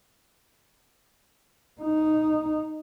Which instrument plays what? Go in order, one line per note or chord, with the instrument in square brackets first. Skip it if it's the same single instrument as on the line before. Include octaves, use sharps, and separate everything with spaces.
[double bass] D#4